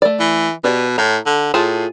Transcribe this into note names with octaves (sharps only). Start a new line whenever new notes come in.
A3 D5
E3
B2 G4 B4 D5
A2 A#5
D3
A2 F4 G#4 A5